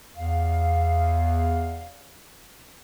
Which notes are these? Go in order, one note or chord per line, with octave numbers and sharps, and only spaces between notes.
E2 F5